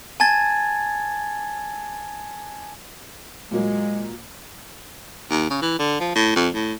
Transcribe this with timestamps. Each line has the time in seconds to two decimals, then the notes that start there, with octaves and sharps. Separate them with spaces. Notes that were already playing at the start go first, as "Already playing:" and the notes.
0.20 G#5 A5 G#6 A6
3.51 A#2 F#3 G#3 A#3
5.30 D#2
5.50 C#3
5.62 E3
5.79 D3
6.00 F3
6.15 A2
6.36 F2
6.54 A2